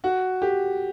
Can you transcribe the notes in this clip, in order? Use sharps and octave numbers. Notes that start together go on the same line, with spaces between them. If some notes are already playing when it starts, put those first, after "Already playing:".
F#4
G4